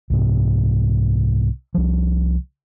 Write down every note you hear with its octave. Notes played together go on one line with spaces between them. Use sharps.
C2 G#2 C3
C2 F3